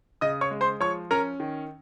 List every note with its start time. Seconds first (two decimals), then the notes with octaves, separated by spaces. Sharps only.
0.21 C#3 D#5 D#6
0.41 C#5 C#6
0.51 G#3
0.61 C5 C6
0.81 F3 C#5 C#6
1.11 C#4 A#4 A#5
1.40 D#3